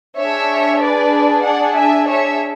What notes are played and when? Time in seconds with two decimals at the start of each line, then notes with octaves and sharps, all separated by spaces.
0.17 D4 G#4 C#5 E5
0.81 B4 D5
1.44 D5 F#5
1.75 E5 G#5
2.07 C#5 E5